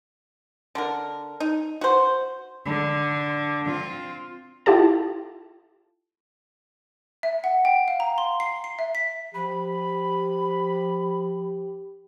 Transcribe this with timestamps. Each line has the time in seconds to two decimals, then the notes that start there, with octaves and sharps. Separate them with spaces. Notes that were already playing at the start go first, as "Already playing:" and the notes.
0.75 D3 D4 A#4
1.40 D#4
1.81 F#4 C5
2.66 D3
3.66 C4 F4
4.66 E4 F4 G4 A4 A5
7.23 E5
7.44 F#5
7.65 G5
7.88 F5
8.00 A#5
8.18 C6
8.40 C7
8.64 C7
8.79 E5
8.95 B6
9.34 F3 G4 B5